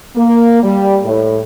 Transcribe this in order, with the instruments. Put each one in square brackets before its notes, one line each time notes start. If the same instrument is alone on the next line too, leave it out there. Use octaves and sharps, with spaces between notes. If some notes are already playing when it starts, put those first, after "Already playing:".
[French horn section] A#3
G3
A2